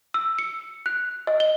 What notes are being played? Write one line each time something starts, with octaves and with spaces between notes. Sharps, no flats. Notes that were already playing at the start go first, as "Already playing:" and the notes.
E6
C#7
F#6
D#5
G7